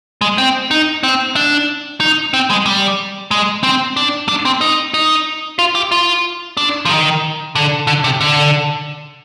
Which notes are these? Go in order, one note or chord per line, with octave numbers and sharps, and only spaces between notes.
G#3
C4
D#4
C4
D4
D#4
C4
G#3
G3
G#3
C4
D4
D4
C4
D#4
D#4
F4
G4
F4
D4
F3
D#3
D3
D3
C3
D3